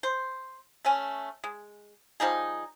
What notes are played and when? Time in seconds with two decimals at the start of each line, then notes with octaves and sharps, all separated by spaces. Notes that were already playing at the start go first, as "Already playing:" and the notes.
0.03 C5
0.85 A3 C#4 G#5
1.44 G#3
2.20 F3 G3 D#4 G#4